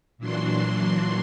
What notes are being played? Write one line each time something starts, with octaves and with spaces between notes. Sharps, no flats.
A#2 E3 F#3 D4 F#4 C6